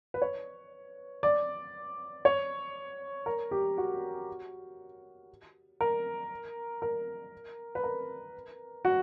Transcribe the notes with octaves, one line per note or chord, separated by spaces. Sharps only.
B4
C#5
D5
C#5
A#4
G4
F#4
A#4
A#4
B4
A#4
F#4